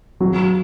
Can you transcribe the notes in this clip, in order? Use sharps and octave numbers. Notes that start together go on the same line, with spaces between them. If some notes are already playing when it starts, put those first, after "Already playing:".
F#3